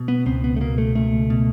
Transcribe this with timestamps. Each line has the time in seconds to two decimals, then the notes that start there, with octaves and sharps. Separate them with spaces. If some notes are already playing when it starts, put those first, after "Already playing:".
Already playing: B2
0.08 B3
0.26 C#2 C4
0.44 B3
0.56 A3
0.61 B2 A#3
0.78 A3
0.95 C#2 A3
1.30 B2